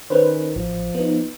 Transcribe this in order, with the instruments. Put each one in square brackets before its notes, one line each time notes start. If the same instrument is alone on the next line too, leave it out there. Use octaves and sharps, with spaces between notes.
[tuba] D#3 [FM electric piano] C#4 B4 C5
[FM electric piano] A1 [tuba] F3
[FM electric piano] B3 D#4